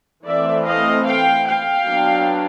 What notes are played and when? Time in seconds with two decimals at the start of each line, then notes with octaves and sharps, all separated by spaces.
0.24 E3 A3 C4 D5 E5
0.64 D#5 F5
1.05 F5 G5
1.45 F5 G5
1.86 F#3 B3 D4